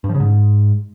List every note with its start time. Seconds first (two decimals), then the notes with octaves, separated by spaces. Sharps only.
0.04 G2
0.09 F3
0.15 C#3
0.20 G#2